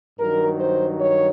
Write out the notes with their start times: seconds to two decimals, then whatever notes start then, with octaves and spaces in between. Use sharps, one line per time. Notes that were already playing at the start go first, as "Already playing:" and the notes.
0.20 G2 D#3 F#3 A#4
0.60 C5
1.01 C#5